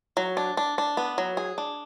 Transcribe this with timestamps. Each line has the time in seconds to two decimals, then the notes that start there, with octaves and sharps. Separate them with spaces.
0.17 F#3
0.37 D4
0.57 D4
0.78 D4
0.97 B3
1.18 F#3
1.37 G#4
1.58 D4